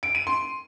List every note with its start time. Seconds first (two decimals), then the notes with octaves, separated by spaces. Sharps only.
0.03 D7
0.15 D#7
0.27 C6